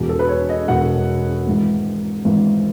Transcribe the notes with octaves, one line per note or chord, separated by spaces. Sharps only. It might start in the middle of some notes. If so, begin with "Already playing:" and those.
Already playing: E1 E2 B2
A4
B4
C#5
D#5
E1 E2 B2 F#5
G#1 G#2 E3
G#1 G#2 E3